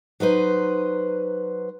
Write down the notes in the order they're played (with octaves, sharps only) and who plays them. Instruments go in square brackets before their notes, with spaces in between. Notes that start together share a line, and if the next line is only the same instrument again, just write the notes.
[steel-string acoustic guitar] F#3 D#4 B4 C5